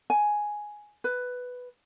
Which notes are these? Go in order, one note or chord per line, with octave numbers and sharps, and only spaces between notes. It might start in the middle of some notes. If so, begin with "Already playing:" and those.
G#5
B4